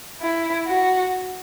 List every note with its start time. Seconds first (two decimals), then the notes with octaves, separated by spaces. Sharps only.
0.21 E4
0.67 F#4